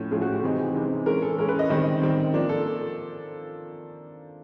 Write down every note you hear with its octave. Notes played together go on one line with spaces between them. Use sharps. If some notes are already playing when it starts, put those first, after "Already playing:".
Already playing: A2 F3 A3 C#4
A2 F3 A3 C#4 G#4
F#4
G4
C3 E3 G#3 C4 D#4
C3 E3 G#3 C4 D#4
E3 G#3 C#4 A#4
A4
E3 G#3 C#4 A#4
B4
D#5
D#3 G3 C4 D#5
D#3 G3 C4
F3 A#3 D4
A4